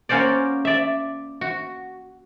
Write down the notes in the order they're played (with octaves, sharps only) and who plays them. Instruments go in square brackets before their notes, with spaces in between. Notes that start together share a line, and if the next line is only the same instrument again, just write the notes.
[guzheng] A#3 C#4 F#4 C5 D5
D5 E5
F#4